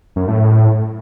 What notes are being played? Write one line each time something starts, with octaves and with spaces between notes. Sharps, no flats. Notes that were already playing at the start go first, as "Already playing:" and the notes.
F#2
A2
A2